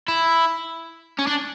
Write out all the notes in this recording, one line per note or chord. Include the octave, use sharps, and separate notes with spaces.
E4
C#4
D4